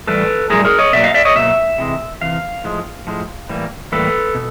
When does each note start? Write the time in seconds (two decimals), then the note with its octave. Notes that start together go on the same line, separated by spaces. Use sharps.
0.07 A2 E3 G3 A4 B4
0.50 A2 E3 G3 G#4 A#4
0.65 G#4 A#4
0.79 C#5 D#5
0.93 B2 F#3 A#3 D5 E5
1.04 D#5 F5
1.14 D5 E5
1.25 C#5 D#5
1.35 B2 F#3 A#3 E5
1.78 C3 E3 G#3
2.21 C3 E3 F5
2.64 A2 F3 G#3
3.07 A2 F3 G#3
3.49 A2 E3 G3 A#3
3.92 A2 E3 G3 A#3 A4 B4
4.35 B2